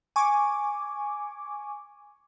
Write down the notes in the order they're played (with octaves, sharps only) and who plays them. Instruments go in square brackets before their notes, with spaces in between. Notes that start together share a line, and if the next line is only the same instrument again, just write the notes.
[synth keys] G#5 C#6 D6